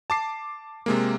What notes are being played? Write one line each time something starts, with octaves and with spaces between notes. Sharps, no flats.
A5 D6 C7
C3 G#3 A#3